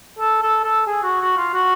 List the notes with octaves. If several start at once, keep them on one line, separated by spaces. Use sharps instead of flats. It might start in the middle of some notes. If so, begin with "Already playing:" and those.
A4
A4
A4
G#4
F#4
F#4
F4
F#4